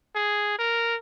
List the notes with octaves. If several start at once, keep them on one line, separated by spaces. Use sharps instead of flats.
G#4
A#4